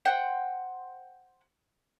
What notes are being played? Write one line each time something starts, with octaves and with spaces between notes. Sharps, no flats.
C5 F#5 G5